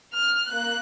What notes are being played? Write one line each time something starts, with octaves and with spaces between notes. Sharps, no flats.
F6
A#3 F#6